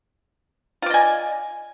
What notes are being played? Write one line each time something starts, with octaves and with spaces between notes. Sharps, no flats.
F4 D5 D#5 G#5